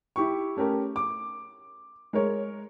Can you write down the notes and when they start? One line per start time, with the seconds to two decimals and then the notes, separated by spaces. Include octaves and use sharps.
0.16 E4 G4 C#6
0.57 A3 C#4 G4 A#4
0.96 D6
2.13 G#3 A#4 C#5